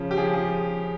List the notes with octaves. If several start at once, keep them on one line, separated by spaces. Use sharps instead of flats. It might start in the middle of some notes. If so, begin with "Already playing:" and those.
Already playing: C#3 F3
G4
C#3 F3 G#4
G#4